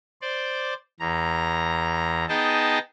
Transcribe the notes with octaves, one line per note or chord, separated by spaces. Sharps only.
C5 D5
E2 A#5
B3 D#4 G#4 D#5 G5 A5